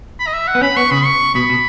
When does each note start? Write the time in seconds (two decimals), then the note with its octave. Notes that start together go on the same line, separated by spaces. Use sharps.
0.19 B5
0.27 D#5
0.33 E5
0.47 F#5
0.55 B3
0.62 C#4 B5
0.77 B3 C#6
0.91 C#3 B5
1.05 C#6
1.35 B2 B5
1.50 B2